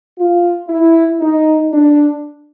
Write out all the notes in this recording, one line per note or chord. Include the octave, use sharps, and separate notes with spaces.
F4
E4
D#4
D4